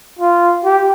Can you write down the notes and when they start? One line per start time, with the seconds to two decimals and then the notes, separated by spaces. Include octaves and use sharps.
0.19 F4
0.65 G4